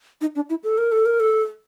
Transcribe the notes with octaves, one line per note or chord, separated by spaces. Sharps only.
D#4
D4
E4
A4
A#4
A4
A#4
A4